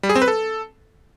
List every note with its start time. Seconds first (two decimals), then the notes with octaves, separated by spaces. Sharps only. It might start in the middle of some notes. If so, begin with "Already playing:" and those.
0.03 G3
0.09 G#4
0.16 C4
0.22 B4
0.28 A4